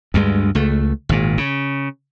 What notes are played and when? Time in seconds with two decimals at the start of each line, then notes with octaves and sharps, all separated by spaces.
0.14 D2 G2 G#3
0.55 C#2 A3
1.09 G#1 A#2
1.38 C#3